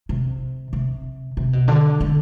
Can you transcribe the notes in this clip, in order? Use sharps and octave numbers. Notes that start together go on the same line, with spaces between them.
C3
C3
C3
B2
D3
D3